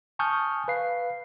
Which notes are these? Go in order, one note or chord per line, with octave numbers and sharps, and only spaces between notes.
G#5 A5 C#6 D#6 F6 G6
B4 F5 C7